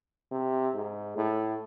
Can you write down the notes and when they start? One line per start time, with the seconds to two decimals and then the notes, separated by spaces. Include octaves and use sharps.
0.31 C3
0.74 G#2
1.16 A2